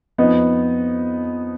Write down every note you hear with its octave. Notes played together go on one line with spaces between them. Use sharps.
F2 F3 B3 D#4